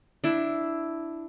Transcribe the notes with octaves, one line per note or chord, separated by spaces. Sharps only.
D4 E4